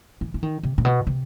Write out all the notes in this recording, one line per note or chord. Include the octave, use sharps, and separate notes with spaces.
E3
E3
D#3
C3
A#2
B2
C3